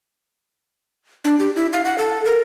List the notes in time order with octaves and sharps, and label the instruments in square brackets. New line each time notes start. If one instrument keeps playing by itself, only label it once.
[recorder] D4
G4
E4
F5
F#5
A4
A#4